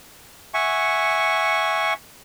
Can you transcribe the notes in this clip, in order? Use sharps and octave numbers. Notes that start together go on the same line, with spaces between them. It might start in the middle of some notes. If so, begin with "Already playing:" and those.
E5 F#5 G#5 C#6